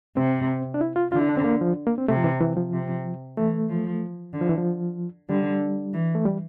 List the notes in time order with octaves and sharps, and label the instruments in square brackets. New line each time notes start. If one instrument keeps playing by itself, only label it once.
[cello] C3 [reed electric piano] C4
[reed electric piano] D4
E4
F4
[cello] D3 [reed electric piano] F4
[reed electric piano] E4
D4
C4
A#3
F3
A#3
C4
[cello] C3 [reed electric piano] A3
[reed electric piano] F3
E3
E3
F3
[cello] C3
[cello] E3 [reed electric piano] A3
[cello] F3
D3
[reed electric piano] F3
E3
F3
[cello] D3 [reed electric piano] G3
[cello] E3
[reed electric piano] A3
G3